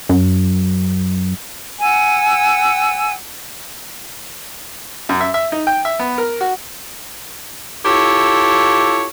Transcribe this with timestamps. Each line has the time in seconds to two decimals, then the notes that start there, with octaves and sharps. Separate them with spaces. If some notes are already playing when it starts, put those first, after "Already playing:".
0.09 F#2
1.80 F#5 G#5 E6
5.09 F#2
5.21 E5
5.34 E5
5.52 D#4
5.67 G5
5.85 E5
5.99 B3
6.18 A#4
6.41 F#4
7.86 E4 F4 G4 A4 C#5